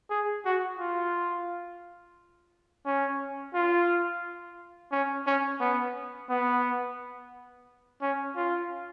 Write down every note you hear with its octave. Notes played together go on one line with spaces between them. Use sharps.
G#4
F#4
F4
C#4
F4
C#4
C#4
B3
B3
C#4
F4